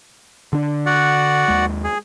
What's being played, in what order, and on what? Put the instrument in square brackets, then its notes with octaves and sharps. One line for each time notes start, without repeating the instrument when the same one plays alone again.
[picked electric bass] D3 D4
[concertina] F#4 D5 F#5
[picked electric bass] D#2 G#3
[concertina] G#4